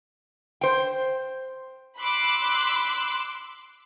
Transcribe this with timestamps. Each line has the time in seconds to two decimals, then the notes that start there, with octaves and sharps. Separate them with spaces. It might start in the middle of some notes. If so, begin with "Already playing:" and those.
0.61 C5 G5
2.00 B5 C6 D6 E6 F#6